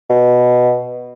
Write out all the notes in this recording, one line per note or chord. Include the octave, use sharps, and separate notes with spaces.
B2